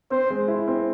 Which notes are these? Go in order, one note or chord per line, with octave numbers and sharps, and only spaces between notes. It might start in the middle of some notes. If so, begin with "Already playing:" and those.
C4 C5
G#3
E4
C4